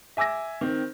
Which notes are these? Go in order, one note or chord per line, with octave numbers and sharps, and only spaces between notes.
E5 G#5 D6 E6 A#6
D#3 C4